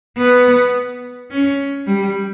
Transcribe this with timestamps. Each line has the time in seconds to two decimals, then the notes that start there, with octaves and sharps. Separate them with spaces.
0.18 B3
1.31 C#4
1.87 G3